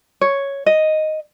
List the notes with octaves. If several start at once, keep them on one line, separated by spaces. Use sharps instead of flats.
C#5
D#5